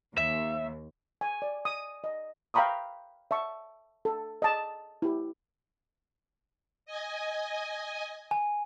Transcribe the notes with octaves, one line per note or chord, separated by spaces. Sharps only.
D#2 E5
G#5
D5
D#6
D#5
F5 G5 A#5 B5 C#6 D#6
E5 A5 C#6
A4
D#5 A5
E4 G4
D#5 G#5
G#5